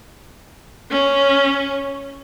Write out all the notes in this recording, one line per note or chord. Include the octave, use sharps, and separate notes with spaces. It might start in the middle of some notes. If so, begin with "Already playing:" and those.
C#4